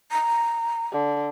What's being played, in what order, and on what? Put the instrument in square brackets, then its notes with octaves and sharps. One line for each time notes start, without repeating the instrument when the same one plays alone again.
[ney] A#5
[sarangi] D3